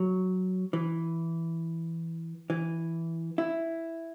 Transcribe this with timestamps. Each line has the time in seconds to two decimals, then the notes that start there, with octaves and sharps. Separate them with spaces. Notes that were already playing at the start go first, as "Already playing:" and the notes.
Already playing: F#3
0.73 E3
2.50 E3
3.38 E4